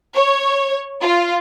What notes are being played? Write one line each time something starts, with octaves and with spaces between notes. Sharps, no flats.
C#5
F4